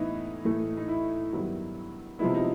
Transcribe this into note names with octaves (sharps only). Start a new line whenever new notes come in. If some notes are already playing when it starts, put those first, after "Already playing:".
Already playing: A2 E3 B3 D#4 E4
A2 E3 A3
D#4
E4
G2 D#3 F#3 B3
C3 F3 G#3 B3 E4
D#4